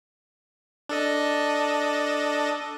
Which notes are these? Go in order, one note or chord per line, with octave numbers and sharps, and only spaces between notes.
D4 A4 D#5